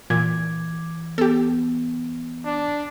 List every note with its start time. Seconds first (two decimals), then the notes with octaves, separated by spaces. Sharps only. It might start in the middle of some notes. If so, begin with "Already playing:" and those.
0.10 A#2 E3 D6 G#6
1.18 B3 G4 A4
2.45 D4